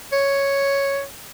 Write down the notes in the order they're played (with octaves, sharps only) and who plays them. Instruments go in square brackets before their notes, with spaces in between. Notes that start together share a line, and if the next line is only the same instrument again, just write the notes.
[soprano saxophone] C#5